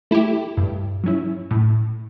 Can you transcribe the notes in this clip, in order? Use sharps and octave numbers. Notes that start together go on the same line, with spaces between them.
A3 E4 G4
G2
F#3 C#4 E4
A2